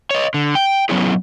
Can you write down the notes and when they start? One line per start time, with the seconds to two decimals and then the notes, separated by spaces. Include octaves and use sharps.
0.11 C#5 D#5
0.34 D3
0.55 G5
0.89 F#3 B3 C#4 E4 G#4